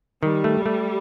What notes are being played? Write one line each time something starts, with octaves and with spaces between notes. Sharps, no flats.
D#3 G3
A3
A3